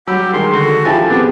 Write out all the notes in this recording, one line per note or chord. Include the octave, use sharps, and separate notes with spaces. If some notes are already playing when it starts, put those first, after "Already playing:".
F#3 G3 G4 F#5 B5 E6
D#3 G#3 A#4 C6
D3 F#4 A4
F3 E4 G4 G#5 A5 B5
B3 C4 D4 G4 G#4 B4